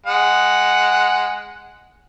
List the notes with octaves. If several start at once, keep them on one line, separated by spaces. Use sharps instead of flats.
G#3 F#5